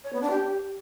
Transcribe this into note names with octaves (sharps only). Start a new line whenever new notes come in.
C#5
B3
D4
G4